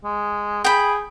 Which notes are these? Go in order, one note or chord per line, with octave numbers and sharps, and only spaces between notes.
G#3
G#4 G5 B5